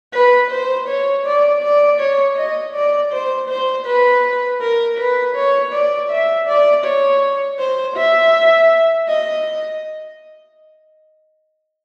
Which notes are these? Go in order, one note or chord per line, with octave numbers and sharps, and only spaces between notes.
B4
C5
C#5
D5
D5
C#5
D#5
D5
C5
C5
B4
A#4
B4
C#5
D5
E5
D5
C#5
C5
E5
D#5